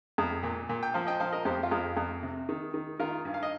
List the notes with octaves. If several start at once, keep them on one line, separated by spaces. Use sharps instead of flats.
F2
A#2
A#2
G5
F3 C5 F5
D#5 G5
F3 C5 F5
A#4 D#5
F2 G4 C5
F4
F2
F2
C3
D#3
D#3
D#3 F4 A#4
G2
F5
D#5